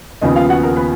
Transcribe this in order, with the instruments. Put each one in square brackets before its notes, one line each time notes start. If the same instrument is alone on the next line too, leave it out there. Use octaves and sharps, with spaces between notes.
[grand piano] D#2 C#3 F3 B3 D#4 D#5
F4 F5
F#4 F#5
A#4
B3 B4